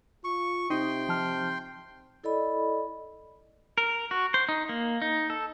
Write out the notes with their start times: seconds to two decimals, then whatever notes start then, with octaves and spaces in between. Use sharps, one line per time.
0.24 F4 C#6
0.70 C3 D#4 G5 C6
1.09 F3 A5 F6
2.24 E4 A4 D5 D#5 B5
3.78 A#4
4.11 F#4
4.34 C5
4.49 D#4
4.69 A#3
5.02 D#4
5.30 A4